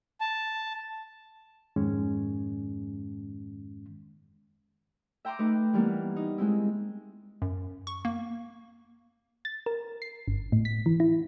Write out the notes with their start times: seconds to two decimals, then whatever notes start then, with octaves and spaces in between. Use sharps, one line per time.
0.21 A5
1.76 F2 G#2 D#3 G#3 C#4
5.25 E5 G5 A#5 C6 D6
5.39 A3 D#4 B4
5.73 E3 G3 A#3 B3
6.16 D#4
6.38 G#3 C4 E4
7.42 F#2
7.87 C#6
8.05 A#3
9.45 A6
9.66 A#4
10.02 C7
10.28 G1
10.52 A2
10.65 B6
10.86 E3
11.00 E4